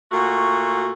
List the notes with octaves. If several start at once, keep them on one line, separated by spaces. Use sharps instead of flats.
A#2 A3 F#4